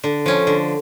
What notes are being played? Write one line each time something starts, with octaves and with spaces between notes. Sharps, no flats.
D3
F3 C#4
D3